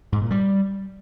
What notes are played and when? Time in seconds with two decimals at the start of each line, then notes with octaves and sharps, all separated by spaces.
0.12 G#2
0.22 A#2
0.31 G3